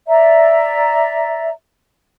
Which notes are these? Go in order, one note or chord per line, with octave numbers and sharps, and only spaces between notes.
D5 E5 A#5